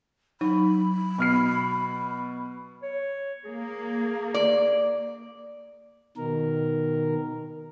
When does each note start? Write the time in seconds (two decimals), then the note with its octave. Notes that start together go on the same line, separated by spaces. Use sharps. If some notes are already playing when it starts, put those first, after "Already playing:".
0.41 F#3 D#4 B5
1.18 B2 F6 C7
2.83 C#5
3.45 A#3 G#4
4.34 D5
6.17 B2 D#3 A#4